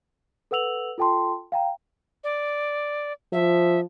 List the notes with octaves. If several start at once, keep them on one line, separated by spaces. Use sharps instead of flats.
A4 B4 F#5 E6 F7 F#7
F4 A4 G5 A5 C6
F5 G5 A#5
D5
F3 E5